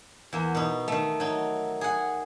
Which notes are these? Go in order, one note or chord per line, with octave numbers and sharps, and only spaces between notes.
E2 A#3
B2 D#4
D#3 A3
F#3 D#4
G#4 F#5